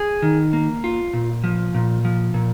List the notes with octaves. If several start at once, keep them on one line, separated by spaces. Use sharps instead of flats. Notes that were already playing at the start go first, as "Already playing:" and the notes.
Already playing: G#4
D#3
A#3
F4
A#2
F3
A#2
F3
A#2